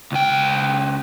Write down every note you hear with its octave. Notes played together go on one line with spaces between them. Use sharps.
C#2 G5